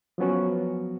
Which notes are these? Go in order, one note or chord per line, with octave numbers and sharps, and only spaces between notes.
F3 F#3 B3 C#4 F#4